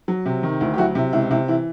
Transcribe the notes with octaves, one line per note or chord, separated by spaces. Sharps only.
F#3
C3
D#3
D2 E4
G4
F#3 E4 F#4
C3 E4
C#2 E4
C3 E4
E3 E4